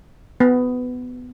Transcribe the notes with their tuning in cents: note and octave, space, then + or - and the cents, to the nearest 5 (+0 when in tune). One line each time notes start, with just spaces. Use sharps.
B3 +15